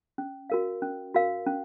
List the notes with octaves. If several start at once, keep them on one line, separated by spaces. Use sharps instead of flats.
C#4
F#4 A#4 F5
C#4
F#4 A#4 F5
C#4